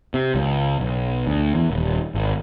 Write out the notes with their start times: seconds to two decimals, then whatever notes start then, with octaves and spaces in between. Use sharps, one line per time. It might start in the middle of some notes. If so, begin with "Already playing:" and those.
0.14 C3
0.35 C#2
0.80 B1
1.27 D2
1.55 E2
1.71 D#1
2.15 G#1